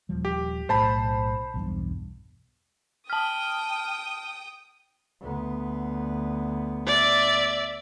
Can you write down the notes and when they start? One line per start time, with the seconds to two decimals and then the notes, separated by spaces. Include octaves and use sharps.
0.09 D#1 F3 G3
0.25 G4
0.69 B1 A2 C5 A5 B5
1.54 B1 E2 G2
3.10 G5 A5 D#6 F6
5.21 D2 B3
6.87 D5 E5